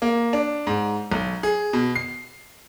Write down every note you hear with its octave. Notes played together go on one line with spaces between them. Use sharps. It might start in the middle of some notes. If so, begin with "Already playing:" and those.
A#3
D4
G#2
B1
G#4
B2
C7